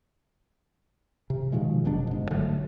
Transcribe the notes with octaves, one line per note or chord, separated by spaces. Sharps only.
C3
B2 D#3 F3 G#3
F1 B2 F#3 D4
G1 G#2
D3 F#3 A3